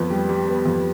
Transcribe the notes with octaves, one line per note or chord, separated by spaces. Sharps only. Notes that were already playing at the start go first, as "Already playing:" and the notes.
Already playing: F2 B3
G3
G3
B3
F2